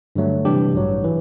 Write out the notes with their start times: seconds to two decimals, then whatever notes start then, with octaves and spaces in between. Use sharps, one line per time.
0.16 G2 D3 F#3 A3
0.45 C3 E3 G3 D4 G4
0.74 A1 G2 F#3
1.04 E3